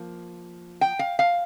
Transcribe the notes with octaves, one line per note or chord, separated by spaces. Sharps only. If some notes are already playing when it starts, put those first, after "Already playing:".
Already playing: F3 A#3
G5
F5
F5